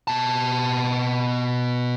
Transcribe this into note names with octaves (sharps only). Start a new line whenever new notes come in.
B2 A5